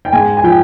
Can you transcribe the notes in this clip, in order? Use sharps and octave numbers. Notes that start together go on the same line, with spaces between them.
G5
G#2 G#5
G#5
F3 G5